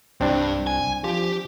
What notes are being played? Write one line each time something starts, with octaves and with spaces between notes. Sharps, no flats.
C2 G2 C4 D4
G#5
F3 G4